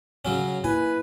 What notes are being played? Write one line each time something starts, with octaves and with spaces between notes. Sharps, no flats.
C#3 F#3 C#4
A#3 E4 B4 G#5